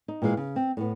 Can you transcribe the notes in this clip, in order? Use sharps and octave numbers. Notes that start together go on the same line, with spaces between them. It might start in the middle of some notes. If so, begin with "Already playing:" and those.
D#4
A#2 E3 G#3 F5
C#3
C4
A2 B3